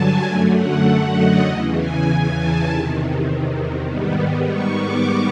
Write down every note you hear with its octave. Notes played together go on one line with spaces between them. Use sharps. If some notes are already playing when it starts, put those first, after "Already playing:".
Already playing: G2 D3 F#3 G#5 A5
F#2 D3 F#3 A3 G#5
F#5
D#5
E2 C#3 E3 D#5
G#5
A5
E2 C3 D#3 A5
G#2 D#3 G3 B3
C#6
D6